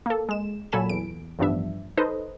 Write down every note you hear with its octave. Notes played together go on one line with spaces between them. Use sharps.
A#3 A4
G#3 E7
A#2 F#3 A4 G#5 B5 E7
E2 D7
A1 G2 F3 B3 D4 E5
D#4 A4 B4 C5 D#5